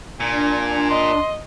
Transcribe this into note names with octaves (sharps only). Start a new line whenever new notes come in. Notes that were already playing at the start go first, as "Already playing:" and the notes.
A#2 D4 G#5
D#5 C6